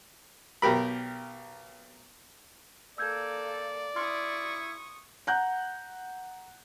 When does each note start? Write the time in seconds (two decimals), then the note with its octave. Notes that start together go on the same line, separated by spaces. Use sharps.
0.62 B1 G4 A#4 B5
2.98 A#3 A4 D5 E6 G6 G#6
3.96 E4 C6 C#6 D#6 F6
5.27 F#5 A#5 F#6 G6